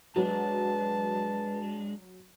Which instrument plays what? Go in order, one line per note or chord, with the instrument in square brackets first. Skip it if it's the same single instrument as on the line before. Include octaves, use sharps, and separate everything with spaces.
[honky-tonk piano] F#3 [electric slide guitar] G#3 D4 [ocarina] B4 [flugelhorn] A5